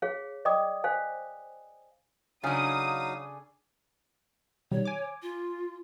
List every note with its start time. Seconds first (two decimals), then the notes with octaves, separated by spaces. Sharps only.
0.02 G#4 C#5 F5
0.45 D5 D#5 G5 D6 D#6
0.84 C5 F5 G#5
2.43 C#3 F#3 D4 D#4 G#4 A4 F5 D#6
4.71 B2 D#3 G3 C#5
4.85 G#5 D6
5.22 F4